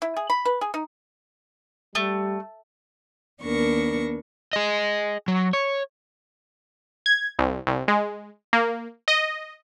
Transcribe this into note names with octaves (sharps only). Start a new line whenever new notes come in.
E4
G#4
B5
B4
G#4
D#4
G3 A3
D#2 B3 D4 A#4 C#6 A#6
G#4 D#5
F#3
C#5
G#6
C2
C2
G#3
A#3
D#5